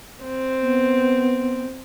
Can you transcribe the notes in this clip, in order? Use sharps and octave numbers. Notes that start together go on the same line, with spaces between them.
C4
B3